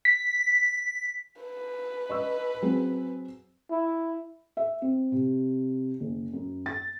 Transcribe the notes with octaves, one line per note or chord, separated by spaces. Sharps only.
B6
B4
D#5 C#6 E6
F#3 C4 G#4
E4
E5
C4
C3
F#1
F#2
A6